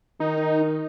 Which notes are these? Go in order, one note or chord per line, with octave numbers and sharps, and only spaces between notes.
D#3 D#4